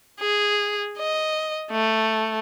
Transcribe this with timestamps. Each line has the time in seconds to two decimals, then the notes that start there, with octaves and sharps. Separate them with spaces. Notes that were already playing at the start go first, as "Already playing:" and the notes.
0.20 G#4
0.98 D#5
1.71 A3